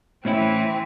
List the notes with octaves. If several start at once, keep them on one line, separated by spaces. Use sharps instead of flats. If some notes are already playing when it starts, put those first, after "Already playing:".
A2 E3 C4 C#4 E4